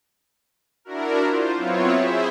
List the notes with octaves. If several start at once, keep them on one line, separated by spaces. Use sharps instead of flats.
D4 E4 F#4 A#4
F4 C5
F#3 B3 C4 E4 F4 C#5
E4 G#4 C5 E5